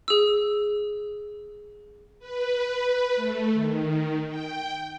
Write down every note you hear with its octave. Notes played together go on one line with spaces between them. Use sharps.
G#4 E6
B4
A3
D#3
G5